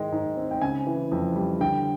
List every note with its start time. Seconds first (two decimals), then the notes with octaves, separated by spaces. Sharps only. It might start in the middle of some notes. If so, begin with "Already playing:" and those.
Already playing: G#2 D#3 G#3 G5
0.12 G#2
0.37 C4
0.51 G5
0.61 C#3 G#5
0.87 E3
1.11 F2
1.36 G3
1.60 D3 G5